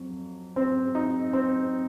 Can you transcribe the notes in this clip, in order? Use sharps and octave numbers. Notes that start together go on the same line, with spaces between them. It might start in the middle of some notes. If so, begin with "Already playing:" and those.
Already playing: F2 F#3
C4
D#4
C4